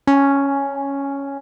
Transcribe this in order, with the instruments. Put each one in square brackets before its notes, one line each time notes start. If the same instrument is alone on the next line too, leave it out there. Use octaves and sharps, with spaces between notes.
[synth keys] C#4